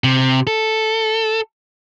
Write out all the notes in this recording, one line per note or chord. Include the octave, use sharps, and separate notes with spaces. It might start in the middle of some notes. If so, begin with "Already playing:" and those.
C3
A4